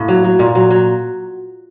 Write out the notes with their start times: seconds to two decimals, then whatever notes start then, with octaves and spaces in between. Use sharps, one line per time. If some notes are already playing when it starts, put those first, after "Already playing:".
Already playing: A2 A#3
0.08 F#3
0.24 F#3
0.39 A#2
0.55 F#3
0.71 F#3